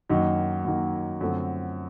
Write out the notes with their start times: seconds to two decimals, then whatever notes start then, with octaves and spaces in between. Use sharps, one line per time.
0.09 F#2 D#3 F#3 A#3 D#4
0.65 F#2 D#3 F#3 A#3 D#4
1.21 F#2 D3 F3 A3 C4